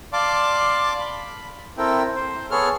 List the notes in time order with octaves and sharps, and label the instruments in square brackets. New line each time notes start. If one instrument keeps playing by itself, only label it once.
[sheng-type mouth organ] D5 F5 A5 C6 D6
B5
C4 E4 A4 A#4 G5
C5
B3 G#4 A4 C#5 F6